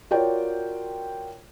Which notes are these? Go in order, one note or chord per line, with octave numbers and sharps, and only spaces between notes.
F4 F#4 A#4 C#5 D5 G5